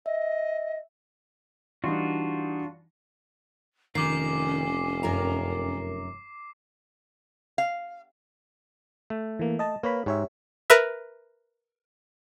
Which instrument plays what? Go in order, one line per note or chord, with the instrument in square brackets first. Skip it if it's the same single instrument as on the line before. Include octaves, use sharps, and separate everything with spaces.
[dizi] D#5 [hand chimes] E5
[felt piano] E3 G3 D#4 [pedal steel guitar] D4 F4 F#4
[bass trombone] F1 [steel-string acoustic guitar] D#3 [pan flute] C#4 [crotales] D6 C7
[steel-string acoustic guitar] F#2 A#4 A#5
[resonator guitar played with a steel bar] F5
[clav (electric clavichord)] A3
[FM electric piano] E3 A#3
D#5 A5
[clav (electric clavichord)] A#3 [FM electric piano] B4 C#5 B5
[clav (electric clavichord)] G#2 [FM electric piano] G4 C#5 E5
[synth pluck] A#4 B4 E5